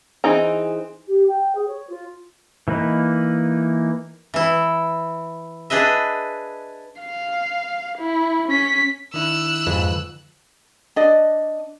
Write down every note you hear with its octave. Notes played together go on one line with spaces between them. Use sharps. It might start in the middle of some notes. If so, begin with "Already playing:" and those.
E3 C4 D#4 G#4 A#5
G4
G5
G#4
C#5
F4
E3 A#3 D#4 B4
E3 E4
D4 G#4 B4 D#5 E5
F5
E4
C#4 B6
D#3 D4 E4 E6 F#6
F2 G#2 D3 F3 B4
D4 D5 D#5